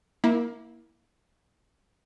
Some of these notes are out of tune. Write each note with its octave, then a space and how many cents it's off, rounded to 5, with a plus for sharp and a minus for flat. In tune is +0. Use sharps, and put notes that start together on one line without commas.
A#3 +20 E4 -15